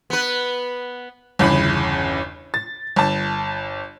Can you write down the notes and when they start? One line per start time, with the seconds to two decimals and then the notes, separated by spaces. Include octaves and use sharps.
0.10 B3 B4
1.39 G1 E2 C#3 B5
2.54 A6
2.96 G1 A5